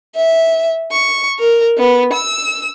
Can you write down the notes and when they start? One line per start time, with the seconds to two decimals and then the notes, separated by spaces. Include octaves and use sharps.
0.16 E5
0.91 C#6
1.39 A#4
1.77 B3
2.12 E6